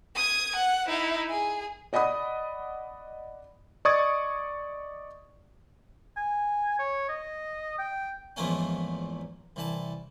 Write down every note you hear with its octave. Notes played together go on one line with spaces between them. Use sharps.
D#6 G#6
F#5
D#4 E4
G#4
D5 D#5 F#5 B5 D#6
D5 D#5 C#6 D#6 G#6 A6
G#5
C#5
D#5
G5
E2 G#2 F3 A3 A#3 C#4
C2 E3 A5